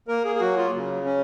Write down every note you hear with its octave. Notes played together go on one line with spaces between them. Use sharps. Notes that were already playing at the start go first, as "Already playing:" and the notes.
A#3 A#4
G#4
G#4
F#3 F#4
F4
C#3
C#4